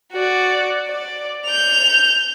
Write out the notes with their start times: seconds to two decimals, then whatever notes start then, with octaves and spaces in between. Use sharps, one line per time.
0.12 F#4 D5
0.88 D5
1.46 G6 F7